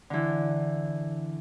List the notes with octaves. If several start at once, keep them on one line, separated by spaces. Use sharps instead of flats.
D3 E3